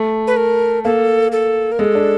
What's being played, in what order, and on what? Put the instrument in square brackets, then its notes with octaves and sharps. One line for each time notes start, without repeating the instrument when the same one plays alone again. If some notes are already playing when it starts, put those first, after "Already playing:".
Already playing: [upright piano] A3
[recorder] B4
A#4
[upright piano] A#3 [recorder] A4
[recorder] A4
A#4
[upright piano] G#3 [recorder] A4
[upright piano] D4